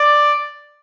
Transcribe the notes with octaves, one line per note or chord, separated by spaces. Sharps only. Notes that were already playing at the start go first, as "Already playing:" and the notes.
Already playing: D5